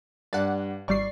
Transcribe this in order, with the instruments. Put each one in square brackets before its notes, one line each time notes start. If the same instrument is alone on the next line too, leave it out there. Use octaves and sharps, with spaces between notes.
[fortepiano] G2 [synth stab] D5 F#5
[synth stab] G#1 G3 C7 [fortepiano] D5 C#6